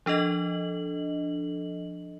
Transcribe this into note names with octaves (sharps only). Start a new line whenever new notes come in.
F3 D4 A4 D#5 F#7